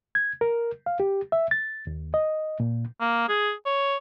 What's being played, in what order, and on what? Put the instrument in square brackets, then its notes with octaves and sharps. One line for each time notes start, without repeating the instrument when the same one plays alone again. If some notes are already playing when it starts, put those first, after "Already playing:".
[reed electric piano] G#6
A#4
F5
G4
E5
A6
D#2
D#5
A#2
[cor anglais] A#3
G#4
C#5